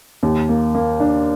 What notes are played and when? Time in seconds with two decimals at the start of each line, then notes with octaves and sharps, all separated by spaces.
0.23 D#2
0.49 A#3
0.75 A#3
1.00 D4